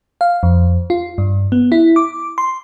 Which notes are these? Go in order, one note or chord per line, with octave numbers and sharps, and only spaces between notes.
F5
F2
F4
G2
B3
E4
D6
C6